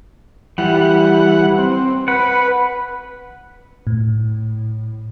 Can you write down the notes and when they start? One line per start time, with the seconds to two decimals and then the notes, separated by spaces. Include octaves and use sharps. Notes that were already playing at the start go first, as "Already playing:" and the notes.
0.58 E3 G3 F#5
1.58 C4
2.08 B4 F#5
3.87 A2